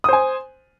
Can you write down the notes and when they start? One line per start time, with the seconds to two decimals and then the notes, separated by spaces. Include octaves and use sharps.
0.04 D#6
0.09 C5
0.13 G#5